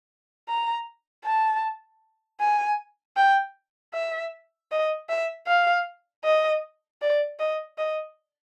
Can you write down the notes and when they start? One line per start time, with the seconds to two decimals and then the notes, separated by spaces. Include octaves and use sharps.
0.49 A#5
1.25 A5
2.40 G#5
3.17 G5
3.94 E5
4.71 D#5
5.09 E5
5.48 F5
6.24 D#5
7.02 D5
7.39 D#5
7.78 D#5